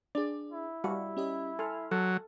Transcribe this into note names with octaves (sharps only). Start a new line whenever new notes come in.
D4 G#4 D5
E4
G3 F#4 F5
C#4 G4 D#5
A4 G#5 C6 F6
F#3 A4